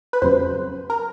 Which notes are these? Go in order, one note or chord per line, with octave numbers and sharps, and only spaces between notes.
B4
F2 C#3 F#3 C5
A#4